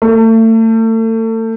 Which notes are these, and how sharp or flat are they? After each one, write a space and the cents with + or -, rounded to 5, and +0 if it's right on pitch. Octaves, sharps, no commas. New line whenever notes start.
A3 +35